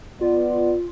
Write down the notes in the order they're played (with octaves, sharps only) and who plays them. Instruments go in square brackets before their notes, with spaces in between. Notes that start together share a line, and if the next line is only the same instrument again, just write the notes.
[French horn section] B3 D5 [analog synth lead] F4